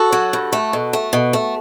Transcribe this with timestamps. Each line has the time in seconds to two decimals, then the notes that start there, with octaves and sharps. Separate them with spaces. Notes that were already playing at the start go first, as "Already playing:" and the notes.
Already playing: F#4 A4
0.12 F#3
0.33 G2
0.53 A3
0.73 B2
0.93 A3
1.13 B2
1.33 A3